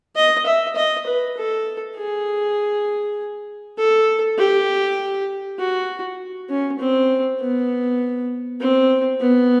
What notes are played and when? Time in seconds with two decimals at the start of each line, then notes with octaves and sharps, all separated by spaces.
0.16 D#5
0.46 E5
0.76 D#5
1.07 B4
1.37 A4
1.97 G#4
3.78 A4
4.38 G4
5.59 F#4
6.49 C#4
6.79 C4
7.40 B3
8.60 C4
9.20 B3